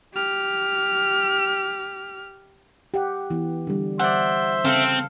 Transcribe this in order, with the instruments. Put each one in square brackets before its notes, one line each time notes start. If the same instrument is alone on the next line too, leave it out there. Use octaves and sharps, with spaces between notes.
[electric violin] G4 F6
[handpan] G4 F#5
E3 B3
D3 G3
[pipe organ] C5 E5 G6 [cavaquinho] D5 F#5
[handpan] C#3 [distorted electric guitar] C4 [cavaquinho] A4 F5